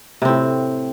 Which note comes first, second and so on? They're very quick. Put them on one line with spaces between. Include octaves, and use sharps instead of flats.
C3 C4 A2